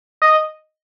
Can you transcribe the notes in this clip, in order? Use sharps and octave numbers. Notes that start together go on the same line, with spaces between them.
D#5